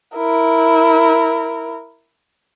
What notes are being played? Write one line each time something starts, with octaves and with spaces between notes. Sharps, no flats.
E4 A#4